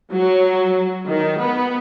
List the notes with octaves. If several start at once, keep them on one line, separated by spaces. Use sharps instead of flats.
F#3
D#3
B3